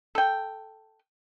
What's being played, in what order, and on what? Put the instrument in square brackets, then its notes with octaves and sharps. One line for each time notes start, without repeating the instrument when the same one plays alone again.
[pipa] A4 G5